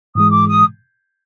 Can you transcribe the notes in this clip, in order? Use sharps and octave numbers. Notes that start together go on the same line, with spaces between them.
G#2 E3 G#3 D#6
D6
D#6